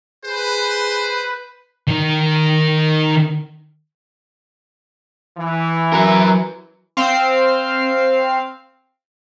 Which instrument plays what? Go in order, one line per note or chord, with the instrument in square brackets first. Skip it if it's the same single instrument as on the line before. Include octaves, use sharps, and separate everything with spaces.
[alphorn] G#4 [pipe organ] B4 [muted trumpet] C5
[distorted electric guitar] D#3 D#4
[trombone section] E3
[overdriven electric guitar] F#3 A#4
[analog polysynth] C4 F5 C7